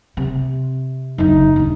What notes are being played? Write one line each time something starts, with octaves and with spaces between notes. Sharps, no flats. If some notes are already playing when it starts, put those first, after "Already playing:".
C3
F#1 D2 D#4
D#1 D3